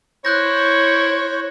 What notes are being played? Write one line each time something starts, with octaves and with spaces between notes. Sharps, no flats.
E4 C5 C#5 F#6 G6 A#6